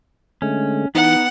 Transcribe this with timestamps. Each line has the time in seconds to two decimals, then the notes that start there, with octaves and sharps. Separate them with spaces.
0.42 D3 G#3 A3 C#4
0.95 E3 B3 D#4 F#5